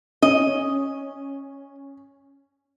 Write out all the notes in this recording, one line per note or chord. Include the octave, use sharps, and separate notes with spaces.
C#4 D#5